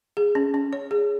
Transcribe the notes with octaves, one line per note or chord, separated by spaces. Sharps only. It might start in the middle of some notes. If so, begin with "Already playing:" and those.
G#4
C#4
C#4
C#5
G#4